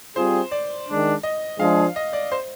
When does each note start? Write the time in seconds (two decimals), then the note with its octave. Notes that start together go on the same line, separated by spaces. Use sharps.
0.16 G3 C4 F4 G#4 C5
0.51 D5
0.87 D#3 G#3 D4
1.23 D#5
1.59 F3 G#3 D4 G#4 F5
1.96 D#5
2.13 D5
2.32 C5